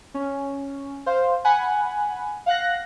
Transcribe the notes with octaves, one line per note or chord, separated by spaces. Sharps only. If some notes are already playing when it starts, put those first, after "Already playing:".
C#4
C5 F5
F#5 G#5 B5
F5 F#5 F#6 A#6